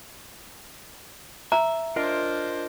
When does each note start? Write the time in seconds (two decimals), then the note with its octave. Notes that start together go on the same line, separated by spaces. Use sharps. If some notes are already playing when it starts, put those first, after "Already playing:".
1.52 E5 A#5
1.96 D4 F4 A#4 C5 D#5